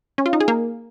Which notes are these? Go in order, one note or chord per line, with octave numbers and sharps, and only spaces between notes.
C#4
F4
D#4
G#4
A#3